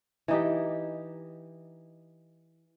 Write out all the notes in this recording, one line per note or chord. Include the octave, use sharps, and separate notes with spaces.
E3 D#4 G4